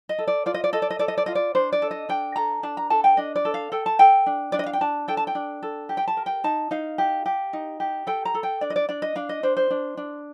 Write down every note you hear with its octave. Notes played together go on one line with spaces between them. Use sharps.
D#5
A4
D5
F4 D5
D#5
D5
A4 D#5
D5
D#5
A4 D5
D#5
D5
F4 D#5
D5
D4 C5
D5
A4
D#5
D4 G5
A4 A#5
D4 A5
A#5
A4 A5
G5
D4 D#5
D5
A4
F5
A4 G5
A5
A4 G5
D4
D4 D5
D#5
F5
G5
D4 A5
A4 G5
A5
G5
D4
A4
G4
G5
A5
A#4
G5
D#4 A5
D#4 F5
G4
G4
D#4
G4
A4 G5
A#5
A4
G5
D4 D5
D#5
D5
D4 D5
D#5
D4 F5
D#5
D4 C5
C5
D4
D4